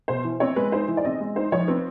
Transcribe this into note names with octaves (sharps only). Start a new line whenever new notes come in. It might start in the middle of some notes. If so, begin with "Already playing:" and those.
B2 C5
E3
C4 C#5
G#3 B4
D#4 C5
E3
D5
C4 D#5
G#3
D#4 C5
F3 C#5
C4 B4